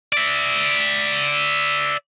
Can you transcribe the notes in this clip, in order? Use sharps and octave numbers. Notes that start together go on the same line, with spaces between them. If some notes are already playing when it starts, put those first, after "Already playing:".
D5 E5